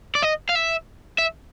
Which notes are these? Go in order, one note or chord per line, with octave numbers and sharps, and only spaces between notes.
D5
D#5
F5
E5
E5